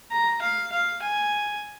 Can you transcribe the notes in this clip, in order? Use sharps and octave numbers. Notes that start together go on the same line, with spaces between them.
A#5
F5
F5
G#5